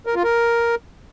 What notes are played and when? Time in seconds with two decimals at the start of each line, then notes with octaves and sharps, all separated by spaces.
0.06 A#4
0.15 F4
0.24 A#4